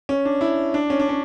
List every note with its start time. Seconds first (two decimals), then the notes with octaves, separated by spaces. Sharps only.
0.09 C#4
0.25 D4
0.41 E4
0.74 D4
0.90 C#4
1.00 D4
1.09 C#4